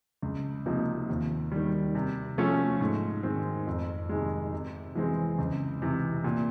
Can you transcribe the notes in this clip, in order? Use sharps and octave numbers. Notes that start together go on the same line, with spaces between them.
C#2
C3 F3 A#3 D#4
D#2
D#3 G3
C3
F3 A3 C#4
G#2
D#3 G#3 C4
F2
C3 D#3 G#3
C3
E3 G#3 C4
C#2
C3 E3
A#2